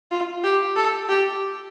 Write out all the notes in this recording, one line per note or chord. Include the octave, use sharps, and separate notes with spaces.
F4
G4
A4
G4